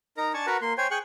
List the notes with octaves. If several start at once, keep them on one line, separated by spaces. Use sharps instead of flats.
D#4 A#4 A#5
D4 G#5 A5 C#6
F#4 A#4 B4 F#5
A#3 C6
C5 C#5 G5 G#5
G#4 G5 C#6 F#6